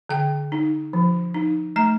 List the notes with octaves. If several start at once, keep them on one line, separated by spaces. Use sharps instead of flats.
D3 G5
D#4
F3
D#4
A3 A#5